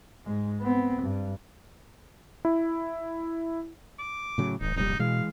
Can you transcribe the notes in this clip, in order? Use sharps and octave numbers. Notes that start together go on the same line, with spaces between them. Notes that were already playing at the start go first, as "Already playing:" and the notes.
G#2 G#3
B3 C4
G2
E4
D6
A2 C#3 F#3
D1 G#1 D#4
F1 A#1 G3 D#4
B2 E3 G#3 F5